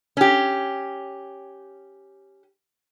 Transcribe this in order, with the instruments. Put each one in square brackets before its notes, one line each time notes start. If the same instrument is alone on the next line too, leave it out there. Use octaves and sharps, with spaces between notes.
[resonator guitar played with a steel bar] C#4 G4